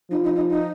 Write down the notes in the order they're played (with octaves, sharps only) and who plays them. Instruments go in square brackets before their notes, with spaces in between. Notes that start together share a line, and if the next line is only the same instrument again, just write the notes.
[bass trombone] F3 [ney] D#4
[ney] D#4
D#4
D#4